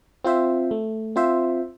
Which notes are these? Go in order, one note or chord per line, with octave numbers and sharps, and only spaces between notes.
C4 F4 C5 E5
A3
C4 F4 C5 E5